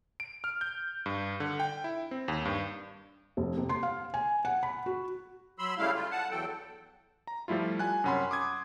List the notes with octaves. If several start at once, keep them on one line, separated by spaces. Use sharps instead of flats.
D7
F6
G6
G2
D3
G5
E4
C4
D#2
G2
F1
C3
C6
F5
G#5
F#5
B5
F#4
F#3 B5 C6 E6
C#3 G3 A3 E4 F5
F4
F#5 A5
E2 E3 F#3 A4 G5
A#5
F3 G3 A3 E4 F4
G#5 F#6
F#2 C3 C#4 F#5 B5 C6
C6 D6 D#6 G#6